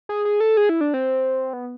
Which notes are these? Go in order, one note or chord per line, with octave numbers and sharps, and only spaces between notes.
G#4
G#4
A4
G#4
E4
D4
C4
B3